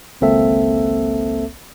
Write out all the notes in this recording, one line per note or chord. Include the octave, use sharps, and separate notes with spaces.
G#1 C#2 A#3 C4 A4 E5